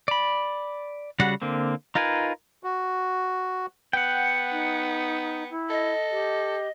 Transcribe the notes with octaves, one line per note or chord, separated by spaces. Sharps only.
D5 B5
C#3 G3 F#4 F#5
D3 A#3 C4
D#4 F4 A#4 B4 G#5
F#4
B3 F#5 G5
D#4
E4
A4 D#5
G4